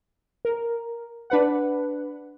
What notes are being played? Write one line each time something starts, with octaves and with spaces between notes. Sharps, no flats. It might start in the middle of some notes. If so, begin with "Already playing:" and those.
A#4
D4 B4 F#5